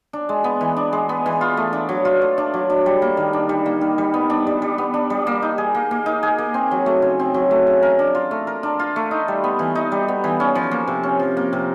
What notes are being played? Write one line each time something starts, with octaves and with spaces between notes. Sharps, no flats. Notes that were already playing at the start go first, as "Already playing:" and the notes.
D4
G#3
B3
E3
D4
G#3
B3
E3
F4
A3
D4
F#3
F4
A3
D4
F#3
D4
G3
A#3
D#3
D4
G3
A#3
D#3
G3
B3
D4
G3
G3
B3
D4
G3
A#3
D#4
G#4
A#3
A#3
D#4
G#4
A#3
C4
F#3
A3
C#3
C4
F#3
A3
C#3
A#4
D4
F4
A3
A#4
D4
F4
A3
D#4
G3
B3
E3
D#4
G3
B3
E3
C#4
F3
A#3
C3
C#4
F3
A#3
C3